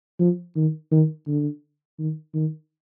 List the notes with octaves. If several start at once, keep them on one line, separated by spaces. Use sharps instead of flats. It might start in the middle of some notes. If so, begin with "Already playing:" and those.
F3
D#3
D#3
D3
D#3
D#3